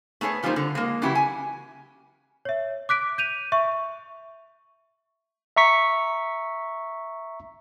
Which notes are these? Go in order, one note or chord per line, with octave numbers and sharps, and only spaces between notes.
A3 B3 G#4 B4 C#5
E3 F3 G3 A#3 D#4 C5
D3
G#3 A#3
C#3 E3 F#3 E4 G4
G#5
C#5 E5
D6 F#6 B6 D7
G6 D#7 F7
E5 C#6
E5 A#5 C#6 B6